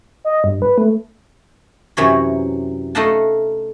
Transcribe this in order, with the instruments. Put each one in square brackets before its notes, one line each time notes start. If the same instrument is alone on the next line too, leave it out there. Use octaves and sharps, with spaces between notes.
[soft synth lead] D#5
G2
B4
A3
[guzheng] F#2 C3 E3 F#3 C#5 B5
A3 D#4 D#5 F5 F#5 A5